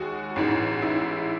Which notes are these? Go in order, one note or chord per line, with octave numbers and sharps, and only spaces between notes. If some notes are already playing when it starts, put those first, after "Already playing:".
Already playing: D#2 G#3 F#4
A1 G#2 E3
E4